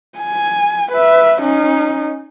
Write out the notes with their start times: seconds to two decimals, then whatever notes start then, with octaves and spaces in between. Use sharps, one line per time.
0.19 G#5
0.92 B4 E5
1.41 C#4 D#4